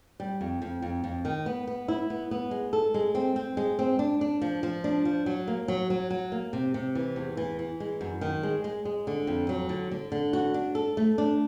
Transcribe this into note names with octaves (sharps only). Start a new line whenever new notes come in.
G3
F2
F2
F2
F2
D#3
B3
B3
E4
B3
B3
G#3
A4
G#3
C4
C4
G#3
C4
D4
D4
F3
F3
D4
F3
F#3
A#3
F#3
F#3
F#3
A#3
C3
C3
E3
E2
E3
E3
G#3
F#2
D#3
G#3
G#3
G#3
D3
F2
F#3
D3
D3
D3
F#4
D4
A4
A3
D4